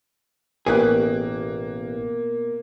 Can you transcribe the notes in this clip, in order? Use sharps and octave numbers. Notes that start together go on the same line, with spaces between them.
A1 B2 A#3 G4 G#4 F#6